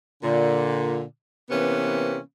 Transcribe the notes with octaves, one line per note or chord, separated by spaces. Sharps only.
A#2 D3
C3 E3 A#3 B3 C#4